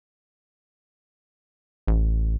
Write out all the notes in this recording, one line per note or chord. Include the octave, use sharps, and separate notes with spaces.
A1